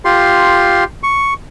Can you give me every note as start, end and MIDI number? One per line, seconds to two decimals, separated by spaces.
0.05 0.84 65
0.05 0.84 67
0.05 0.84 84
1.03 1.34 85